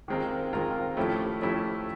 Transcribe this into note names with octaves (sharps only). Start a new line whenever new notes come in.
D#3 G#3 C4 F4 A#4
D#3 G#3 C4 F4 A#4
F3 A3 C#4 E4 G4
F3 A3 C#4 E4 G4